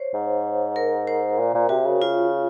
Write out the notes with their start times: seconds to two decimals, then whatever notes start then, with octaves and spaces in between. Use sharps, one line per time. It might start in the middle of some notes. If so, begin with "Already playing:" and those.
Already playing: C5 C#5
0.14 G#2
0.76 A#4
1.07 C5
1.39 A#2
1.54 A#2
1.69 C3 F#4
1.86 C#3
2.02 F4